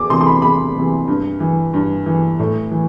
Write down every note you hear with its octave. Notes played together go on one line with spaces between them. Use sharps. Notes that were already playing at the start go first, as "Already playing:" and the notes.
Already playing: E2 D6
C3 E3 C6
C6
B5
E2 B5
C3 E3
G2
E3
G2
E3
A2
E3